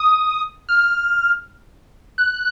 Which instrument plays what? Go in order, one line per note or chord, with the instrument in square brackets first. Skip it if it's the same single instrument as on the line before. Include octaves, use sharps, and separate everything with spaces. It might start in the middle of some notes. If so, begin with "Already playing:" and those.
Already playing: [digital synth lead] D#6
F6
F#6